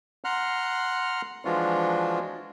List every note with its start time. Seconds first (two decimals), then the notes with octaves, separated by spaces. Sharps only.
0.24 F#5 A#5 C6 F6 F#6
1.45 E3 F3 G#3 D4 F4 F#4